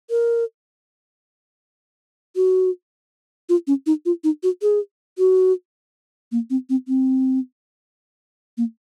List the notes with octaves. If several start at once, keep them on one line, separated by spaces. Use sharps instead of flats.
A#4
F#4
F4
C#4
D#4
F4
D#4
F#4
G#4
F#4
A#3
C4
C4
C4
A#3